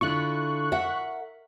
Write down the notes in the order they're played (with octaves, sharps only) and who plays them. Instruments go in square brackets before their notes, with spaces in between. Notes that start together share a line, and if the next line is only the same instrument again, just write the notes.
[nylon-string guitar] D3 E4 F4 [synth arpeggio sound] C#6 F#6
[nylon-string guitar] A#4 E5 F#5